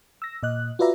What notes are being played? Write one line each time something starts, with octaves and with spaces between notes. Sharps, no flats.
E6 A#6
A#2 D#5 F#6
F4 F#4 B4 D5 E5 A#5